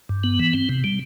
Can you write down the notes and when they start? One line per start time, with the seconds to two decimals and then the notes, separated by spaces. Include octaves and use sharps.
0.09 G2
0.24 B3
0.39 E3
0.53 C4
0.69 C3
0.84 G3